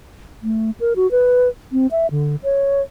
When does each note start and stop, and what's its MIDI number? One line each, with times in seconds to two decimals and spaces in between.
0.43 0.71 57
0.80 0.93 70
0.96 1.10 66
1.11 1.48 71
1.72 1.87 60
1.91 2.07 76
2.11 2.36 50
2.43 2.82 73